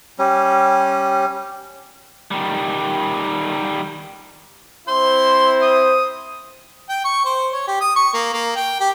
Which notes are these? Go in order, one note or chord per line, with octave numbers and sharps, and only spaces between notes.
G3 C#4
D#3 G3
C4 E4 C5 C6
D#6
G5
C#6
C5
C#5
G4
D#6
C#6
A#3
A#3
G5
G4